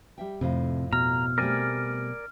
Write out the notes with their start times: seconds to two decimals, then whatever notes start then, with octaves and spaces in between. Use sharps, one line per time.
0.18 G3 E5 G5
0.41 F2 A2 C3 F4
0.93 B2 A#5 F6
1.38 G3 A3 C4 A#4 D5 G#5